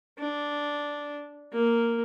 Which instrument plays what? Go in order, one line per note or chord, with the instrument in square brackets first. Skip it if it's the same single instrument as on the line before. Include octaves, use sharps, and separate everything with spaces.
[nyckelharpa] D4
A#3